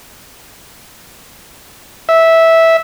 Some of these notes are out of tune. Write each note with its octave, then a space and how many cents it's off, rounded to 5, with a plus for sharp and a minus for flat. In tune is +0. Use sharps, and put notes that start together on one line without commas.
E5 -10